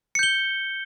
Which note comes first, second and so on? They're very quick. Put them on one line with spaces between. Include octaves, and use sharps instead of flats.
C#7 G6 G7